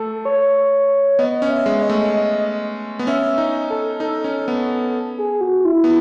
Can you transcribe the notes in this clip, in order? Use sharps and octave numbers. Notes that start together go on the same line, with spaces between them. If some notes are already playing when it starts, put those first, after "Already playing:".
Already playing: A3 A4
C#5
B3 D#5
C#4
E5
G#3
D#5
A3
D#5
B3
C#4 E5
D#4
A4
D#4 A4
C#4
B3
G#4
F#4
E4
B3